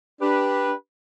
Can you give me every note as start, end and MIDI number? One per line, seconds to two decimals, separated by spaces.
0.21 0.72 62
0.21 0.72 67
0.21 0.72 71